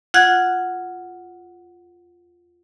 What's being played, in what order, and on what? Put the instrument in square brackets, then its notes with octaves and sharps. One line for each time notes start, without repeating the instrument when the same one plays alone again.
[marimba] F4 F#5 F#6 G#6